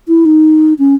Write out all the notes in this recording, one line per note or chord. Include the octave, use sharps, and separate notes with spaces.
E4
D#4
C#4